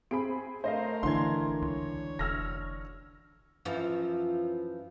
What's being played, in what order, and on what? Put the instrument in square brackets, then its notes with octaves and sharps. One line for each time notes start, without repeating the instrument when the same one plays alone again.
[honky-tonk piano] C4 G#4 B5 [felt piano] D7
[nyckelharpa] A3 A#4 [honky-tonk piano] C5 D#5 F5
[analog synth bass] A1 [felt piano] D3 E3 D4 [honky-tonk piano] C6 G#6
[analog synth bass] C#2 [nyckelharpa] C#5
[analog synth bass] F1 [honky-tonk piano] E6 F6 A#6
[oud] F#2 E3 F3